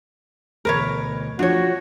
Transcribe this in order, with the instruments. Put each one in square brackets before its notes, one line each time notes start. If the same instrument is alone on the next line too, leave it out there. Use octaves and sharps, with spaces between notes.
[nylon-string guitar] D2 B2 E3 [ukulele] A#4 B4 C#5
[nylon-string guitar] F3 F4 [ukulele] D4 C#5 [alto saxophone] F#4